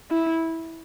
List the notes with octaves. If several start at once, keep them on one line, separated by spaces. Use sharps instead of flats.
E4